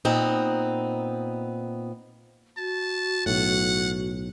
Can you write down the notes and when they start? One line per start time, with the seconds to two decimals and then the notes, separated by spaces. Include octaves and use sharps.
0.05 A#2 B3 C4 D#4
2.57 F#4 A5
3.26 B1 A2 F#5